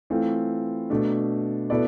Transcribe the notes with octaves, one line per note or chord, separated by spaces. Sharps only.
E3 A3 C4 F4
B2 A3 D4
B2 B3 E4 A4 D5